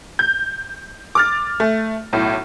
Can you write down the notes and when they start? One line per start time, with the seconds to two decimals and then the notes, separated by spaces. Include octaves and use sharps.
0.19 G6
1.15 D6 F6 A6
1.60 A3
2.13 B1 A2